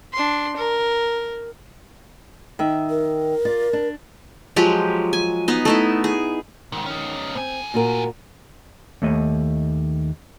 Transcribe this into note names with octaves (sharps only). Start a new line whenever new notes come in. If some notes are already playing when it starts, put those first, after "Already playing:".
D4 C6
A#4
D#3 E5
A#4
F4 D5
D4
F3 F#3 G#3 G4
G#5
B3 D#4
A3 D#4 E4
G#4
C2 G#2 D#3
C#4 D#4
A2 C4 G#5
A#2 F#4 A#4
D#2 A3 D#5